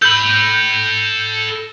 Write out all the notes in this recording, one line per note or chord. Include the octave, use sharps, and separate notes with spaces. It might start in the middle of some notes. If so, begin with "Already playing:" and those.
A4 B5 G6